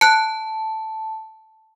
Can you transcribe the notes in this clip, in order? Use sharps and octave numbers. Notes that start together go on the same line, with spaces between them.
A5 F#6 C#7